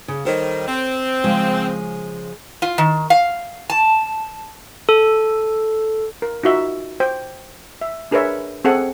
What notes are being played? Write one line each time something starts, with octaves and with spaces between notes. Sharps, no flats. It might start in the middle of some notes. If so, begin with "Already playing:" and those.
C#3
D#3 G3 A4 C5 C#5
C4
C#3 F3 G#3
F4
D#3
F5
A5
A4
A#4
D#4 F4 F#4 E5
C5 G5
E5
D4 G#4 A#4 B4 C#5 E5
C4 G#4 A4 F#5 G#5